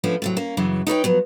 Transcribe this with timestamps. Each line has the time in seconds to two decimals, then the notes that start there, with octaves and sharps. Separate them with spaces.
0.04 F3 A3 B3 C#4 D4
0.22 A2 C3 F#3
0.37 A#3 C#4
0.57 F#2 C#3 E3
0.87 D#4 B4 C#5 G5
1.04 F3 F#3 B3